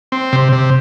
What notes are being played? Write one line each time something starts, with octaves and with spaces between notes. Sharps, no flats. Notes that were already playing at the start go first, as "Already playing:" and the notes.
C4
C3
C3